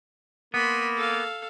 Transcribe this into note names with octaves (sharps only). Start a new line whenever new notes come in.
A#3 B3 B5 C6
A4 F5